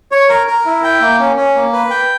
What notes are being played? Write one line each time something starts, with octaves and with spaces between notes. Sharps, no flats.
C#5
A#4
A#4
E4
G5
A#3
C#4
C#4
A#3
B4
G5